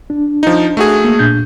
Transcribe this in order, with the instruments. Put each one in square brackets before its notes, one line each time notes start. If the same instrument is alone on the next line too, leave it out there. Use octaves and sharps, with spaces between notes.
[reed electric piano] D4
[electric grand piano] F3 D#4
A3 F#4 G#4
[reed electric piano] A#3
A#2 D4 G6